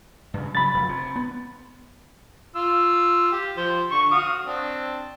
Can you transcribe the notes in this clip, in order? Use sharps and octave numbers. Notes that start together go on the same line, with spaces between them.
G2 C#3
C#3 F#3 B5 A6
F1
C3
B3
F4 E6
G4
F3 C5
D3 C#6
F#4 F5 D#6
C4 D4